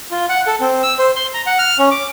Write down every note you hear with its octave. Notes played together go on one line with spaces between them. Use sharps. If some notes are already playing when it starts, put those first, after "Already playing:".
F4
F#5
A4
C4
E6
C5
C6
A#5
F#5
F6
C#4
D6